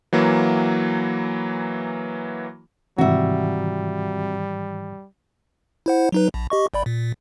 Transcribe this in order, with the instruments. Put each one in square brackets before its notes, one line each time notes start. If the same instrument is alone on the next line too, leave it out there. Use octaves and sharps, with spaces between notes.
[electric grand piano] E3 F#3 A#3
[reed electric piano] G#2 D#3 E3 [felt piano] C3 [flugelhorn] G3 [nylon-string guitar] F#4 E5
[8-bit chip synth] E4 C5 F#5
F#3 D#4 B4
A#1
G4 D#5 C#6
G1 D5 B5
A#2